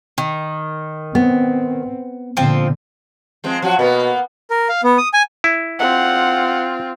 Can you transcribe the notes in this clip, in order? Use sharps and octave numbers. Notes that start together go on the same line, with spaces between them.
D#3
B3 C4
A#2 D3 F3 C4
F3 G#3 C4
F3 F#3 F#4
B2 A#3 B3
A#4
F5
B3
D#6
G#5
E4
C4 F4 F#5